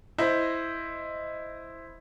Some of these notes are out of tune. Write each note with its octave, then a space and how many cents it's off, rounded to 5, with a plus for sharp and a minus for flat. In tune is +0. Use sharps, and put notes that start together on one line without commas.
E4 +0 C5 +0 D#5 +5